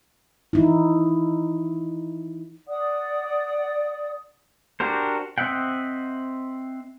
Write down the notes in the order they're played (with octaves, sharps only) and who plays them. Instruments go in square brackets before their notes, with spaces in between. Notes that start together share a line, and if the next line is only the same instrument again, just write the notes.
[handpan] E3 D#4 E4
[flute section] D5 F#5 D#6
[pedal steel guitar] D4 F#4 G4 A#4 C5
C4 D#5 E5 F#5 G5